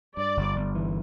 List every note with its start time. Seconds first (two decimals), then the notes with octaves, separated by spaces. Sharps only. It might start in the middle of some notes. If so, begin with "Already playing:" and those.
0.17 G2 D5
0.37 G1
0.56 G1
0.75 E3